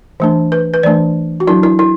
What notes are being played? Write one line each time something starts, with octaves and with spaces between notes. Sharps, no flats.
E3 A3 D4
B4
B4
E3 A3 D4 D5
F#4
F#3 D4 E4
E4
E4